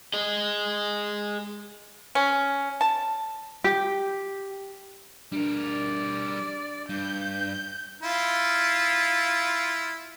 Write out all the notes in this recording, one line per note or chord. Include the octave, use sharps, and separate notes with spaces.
G#4 D#5
C#4
A5
G4
G3 D4 A#4
D5
G2 G6
E4 F4